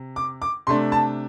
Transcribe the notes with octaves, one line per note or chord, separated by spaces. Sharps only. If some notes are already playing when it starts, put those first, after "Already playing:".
Already playing: C3
D6
D6
C3 A3 D4 C6
A5